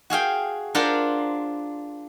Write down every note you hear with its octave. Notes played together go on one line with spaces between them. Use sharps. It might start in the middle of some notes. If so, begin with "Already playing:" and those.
F#4 G#4 F5 G5
D4 F4 A#4 C5 F5 F#5